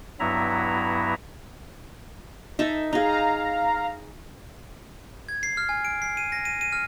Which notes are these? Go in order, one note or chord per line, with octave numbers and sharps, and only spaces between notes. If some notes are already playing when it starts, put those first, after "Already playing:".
G2 F#3 B3 E4 E5 A#5
D#4 A4 E5
D#4 G#4 F5 A#5
G#6
C7
F6
G#5
D7
C7
D#7
A#6
D#7
D#7
F6